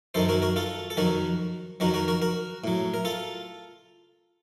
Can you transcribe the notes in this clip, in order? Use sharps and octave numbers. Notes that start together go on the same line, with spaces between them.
F#2 D#3 F#3 A4 C5
F#4 A#4
F#4 A#4
F4 A4
A4
F2 D#3 F#3 F#4 A#4
F2 D#3 F#3 F#4 A#4
F#4 A#4
F#4 A#4
F#4 A#4
A2 F#3
A#4
F4 A4